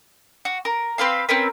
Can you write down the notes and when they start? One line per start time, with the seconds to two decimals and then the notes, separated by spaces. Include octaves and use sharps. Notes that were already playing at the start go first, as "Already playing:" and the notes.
0.45 F#4
0.65 A#4
0.98 C4 B4 F5 C6
1.29 C4 C#4 A#4 B4